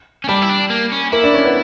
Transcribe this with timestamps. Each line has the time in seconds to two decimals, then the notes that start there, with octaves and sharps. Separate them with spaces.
0.24 C#4
0.29 G3 D4
0.42 E4
0.50 D4
0.70 A#3
0.92 C#4
1.12 A#3 E4
1.24 D4
1.34 C#4
1.45 B3